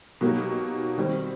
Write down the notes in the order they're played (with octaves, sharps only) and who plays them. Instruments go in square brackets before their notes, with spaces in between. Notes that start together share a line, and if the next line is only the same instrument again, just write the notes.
[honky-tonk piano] B2 F#3 A#3 D#4 G4
D#3 G3 C4